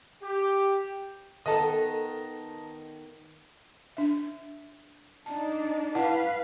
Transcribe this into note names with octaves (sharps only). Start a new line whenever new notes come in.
G4
D#3 B3 A4 D#5 A5 A#5
D4 E5
D4 D#4 A5
E4 B4 F5 F#5 A5